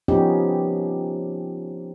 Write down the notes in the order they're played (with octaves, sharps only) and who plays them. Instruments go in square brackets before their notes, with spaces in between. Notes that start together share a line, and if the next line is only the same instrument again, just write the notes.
[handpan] F3 B3 C#4 D#4 G4